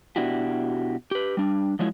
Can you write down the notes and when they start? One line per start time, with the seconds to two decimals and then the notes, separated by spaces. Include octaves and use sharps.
0.16 B2 D4 E4 F#4 G4
1.11 G4 B4
1.37 G3 D4
1.79 F3 F#3 G#3 E4